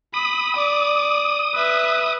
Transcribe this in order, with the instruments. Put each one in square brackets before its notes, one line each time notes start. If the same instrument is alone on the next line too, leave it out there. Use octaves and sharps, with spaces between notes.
[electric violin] B5 [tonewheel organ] D#6
[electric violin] D5
B4 E5